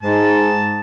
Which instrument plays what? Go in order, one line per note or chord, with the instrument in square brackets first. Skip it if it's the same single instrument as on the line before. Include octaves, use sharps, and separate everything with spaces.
[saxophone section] G#2 [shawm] A5